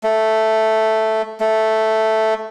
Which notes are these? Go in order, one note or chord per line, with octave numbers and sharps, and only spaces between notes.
A3
A3